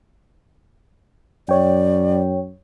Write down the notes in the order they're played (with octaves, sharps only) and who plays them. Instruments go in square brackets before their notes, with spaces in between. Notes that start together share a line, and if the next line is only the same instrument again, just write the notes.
[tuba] F#2 [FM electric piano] C#5 G5 [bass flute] D5